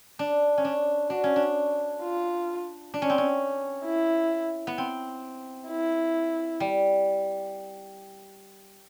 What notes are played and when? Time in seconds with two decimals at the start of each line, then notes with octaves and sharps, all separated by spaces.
0.19 D4
0.58 C#4
0.65 D4
1.10 D4 F#4
1.24 C#4
1.36 D4
2.02 F4
2.94 D4
3.02 C#4
3.10 C4
3.18 C#4
3.86 E4
4.67 B3
4.78 C4
5.69 E4
6.60 G3